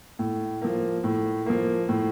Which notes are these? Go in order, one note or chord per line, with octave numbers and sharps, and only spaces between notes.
A2
F3 A#3
A2
F3 A#3
A2